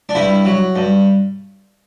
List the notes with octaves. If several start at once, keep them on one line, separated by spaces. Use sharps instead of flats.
D4
G2 E4
F#3
G2